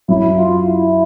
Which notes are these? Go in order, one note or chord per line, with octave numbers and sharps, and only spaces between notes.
F#2 F#3 E4
F4
E4